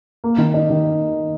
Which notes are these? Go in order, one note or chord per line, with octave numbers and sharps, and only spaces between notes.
A#3
D#3
D#4
D#3